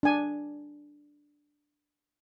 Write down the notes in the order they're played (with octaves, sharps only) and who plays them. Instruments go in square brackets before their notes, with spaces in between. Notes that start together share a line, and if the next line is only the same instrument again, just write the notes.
[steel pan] D4 G#5